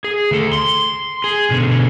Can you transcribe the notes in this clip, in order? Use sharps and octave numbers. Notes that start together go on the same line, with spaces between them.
G#4
D2 A4
C6
G#4
B2 D3